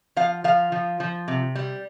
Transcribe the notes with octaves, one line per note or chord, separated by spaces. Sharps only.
F3 F5
F3 F5
F3
F3
C3
G3